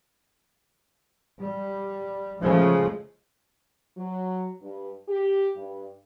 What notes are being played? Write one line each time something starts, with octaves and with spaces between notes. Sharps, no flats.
G3
C#3 F3 G#3 A3
F#3
G2
G4
G2